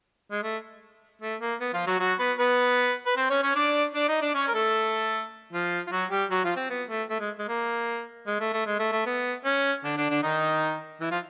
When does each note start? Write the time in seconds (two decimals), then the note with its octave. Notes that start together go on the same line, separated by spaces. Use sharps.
0.31 G#3
0.43 A3
1.21 A3
1.41 A#3
1.60 B3
1.74 F3 F4
1.87 F#3 F#4
1.99 F#3 F#4
2.19 B3 B4
2.38 B3 B4
3.06 B4
3.17 C4 C5
3.30 C#4 C#5
3.43 C#4 C#5
3.56 D4 D5
3.95 D4 D5
4.08 D#4 D#5
4.22 D4 D5
4.34 C#4 C#5
4.48 A#4
4.54 A3 A4
5.52 F3 F4
5.87 F4
5.91 F#3 F#4
6.10 G3 G4
6.30 F#3 F#4
6.44 F3 F4
6.56 C4
6.69 B3
6.89 A3
7.10 A3
7.19 G#3
7.38 G#3
7.48 A#3
8.27 G#3
8.40 A3
8.53 A3
8.66 G#3
8.79 A3
8.92 A3
9.06 B3
9.45 C#4
9.84 D3 D4
9.97 D3 D4
10.10 D3 D4
10.22 D#3 D#4
11.01 E3 E4
11.11 F3 F4